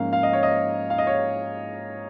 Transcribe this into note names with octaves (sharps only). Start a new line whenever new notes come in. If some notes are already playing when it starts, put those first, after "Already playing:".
Already playing: G#2 F3 A#3 C#4 F5
F5
D#5
C#5
D#5
F5
D#5
C#5